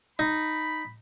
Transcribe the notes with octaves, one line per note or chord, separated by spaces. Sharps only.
D#4 B5